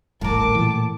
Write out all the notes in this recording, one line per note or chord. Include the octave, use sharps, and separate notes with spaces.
D#1 A1 A2 A#4 A5 D6
A#2 E3